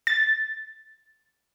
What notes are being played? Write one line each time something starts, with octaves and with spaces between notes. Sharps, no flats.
A6